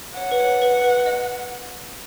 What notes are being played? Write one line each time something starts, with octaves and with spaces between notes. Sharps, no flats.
C#5 F#5
B4
C#5
B4
B4
D#5